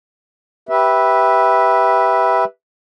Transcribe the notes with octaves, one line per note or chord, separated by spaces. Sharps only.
G4 B4 E5